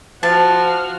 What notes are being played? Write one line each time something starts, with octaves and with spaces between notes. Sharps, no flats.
F3 F#4 A5 F6